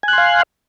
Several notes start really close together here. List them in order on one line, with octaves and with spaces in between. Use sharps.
G#5 F#6 C6 F5